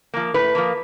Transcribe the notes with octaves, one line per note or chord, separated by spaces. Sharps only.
F3 A#3
A2 B4
F3 A#3